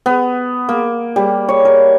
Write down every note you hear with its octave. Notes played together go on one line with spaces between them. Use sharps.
B3
A#3
G3
C#5
A#4